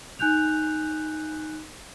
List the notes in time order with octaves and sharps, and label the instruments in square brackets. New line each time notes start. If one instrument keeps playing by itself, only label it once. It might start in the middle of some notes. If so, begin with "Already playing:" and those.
[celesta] D#4 G#5 F#6 G6 F7